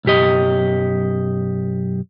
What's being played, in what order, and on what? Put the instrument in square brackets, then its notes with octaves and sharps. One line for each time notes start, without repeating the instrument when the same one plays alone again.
[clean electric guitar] B1 F#2 G4 D#5